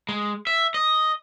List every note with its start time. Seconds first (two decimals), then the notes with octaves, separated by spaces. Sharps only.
0.09 G#3
0.47 E5
0.74 D#5